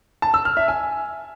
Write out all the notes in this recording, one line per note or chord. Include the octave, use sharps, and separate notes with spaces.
A5
E6
F6
E5
G#5